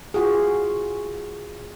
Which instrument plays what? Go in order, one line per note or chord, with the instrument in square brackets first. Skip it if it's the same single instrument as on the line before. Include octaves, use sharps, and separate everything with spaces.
[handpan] F4 F#4 G#4